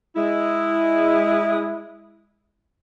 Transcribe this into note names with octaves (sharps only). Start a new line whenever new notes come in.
G#3 E4